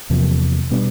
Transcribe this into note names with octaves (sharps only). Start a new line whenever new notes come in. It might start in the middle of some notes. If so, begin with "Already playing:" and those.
E2 C3 F3 A#3
B2 G3 B3 D4